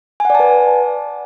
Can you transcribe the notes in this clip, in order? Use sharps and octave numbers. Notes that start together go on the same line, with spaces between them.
B4 D5 F#5 G#5 A5